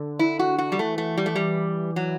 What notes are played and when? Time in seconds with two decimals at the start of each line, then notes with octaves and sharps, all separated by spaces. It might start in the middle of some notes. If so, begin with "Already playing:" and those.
Already playing: D3
0.19 E4
0.39 F#4
0.58 F#4
0.72 G3
0.78 E3 A3
0.98 A3
1.18 G3
1.26 A3
1.36 G3
1.96 F#3